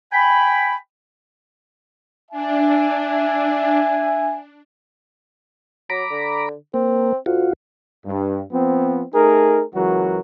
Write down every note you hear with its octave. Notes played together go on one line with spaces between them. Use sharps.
G5 G#5 B5
D4 E5 G#5
F#3 A#5 B5 D6
D3
A#3 C4
D2 F4 F#4
G2
F3 B3 C4
A3 D#4 G#4 A#4
C#2 E3 F#3 F#4 A#4